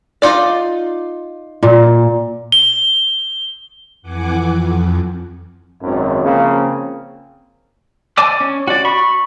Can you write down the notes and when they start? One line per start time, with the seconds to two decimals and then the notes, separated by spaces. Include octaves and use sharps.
0.22 D#4 F4 D5
1.63 A#2
2.52 G7
4.02 F2 E3 F#5 G#5 D6
4.40 F2
5.82 G#1 F#2
6.23 C#3 F3 A#3 C4
8.17 D5 G#5 A5 D6 E6
8.40 C#4
8.68 F#4 D5
8.85 B5 C#6